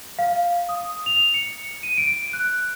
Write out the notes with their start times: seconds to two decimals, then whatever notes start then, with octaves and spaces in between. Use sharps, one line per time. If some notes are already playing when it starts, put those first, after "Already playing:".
0.19 F5
0.69 D#6
1.06 F7
1.34 C#7
1.83 D#7
1.98 D7
2.33 F#6